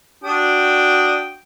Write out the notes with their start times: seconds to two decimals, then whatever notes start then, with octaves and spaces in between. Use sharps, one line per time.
0.24 D4 F#4 G5 D#6